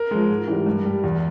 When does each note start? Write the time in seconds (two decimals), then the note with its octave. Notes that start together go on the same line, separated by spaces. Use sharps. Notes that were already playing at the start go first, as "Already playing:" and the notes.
Already playing: A#4
0.11 F3 G#3
0.29 G#2
0.48 E3 G3
0.66 G2
0.85 G3
1.04 E2